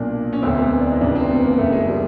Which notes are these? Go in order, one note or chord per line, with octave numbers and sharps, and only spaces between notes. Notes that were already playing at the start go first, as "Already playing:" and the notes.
Already playing: B1 A#2 D4
C#4
E1 D2 D3 C4
B3
D4
D#4
F1 F2 C#3 E3 D4
C4
B3
A#3
F#1 E2 C#3 A3
G#3
G3